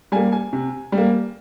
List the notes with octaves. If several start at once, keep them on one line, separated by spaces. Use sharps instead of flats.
G3 A#3 G#5
G#5
C3
G3
A#3